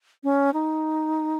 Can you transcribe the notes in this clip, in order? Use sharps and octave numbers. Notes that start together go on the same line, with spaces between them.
C#4
D#4